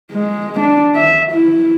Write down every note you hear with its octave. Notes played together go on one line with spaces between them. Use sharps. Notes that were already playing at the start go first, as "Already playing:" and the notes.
G#3
D4
E5
E4